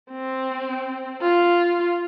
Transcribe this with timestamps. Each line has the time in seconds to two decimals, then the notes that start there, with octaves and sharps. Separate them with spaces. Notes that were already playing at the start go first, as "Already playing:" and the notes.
0.11 C4
1.21 F4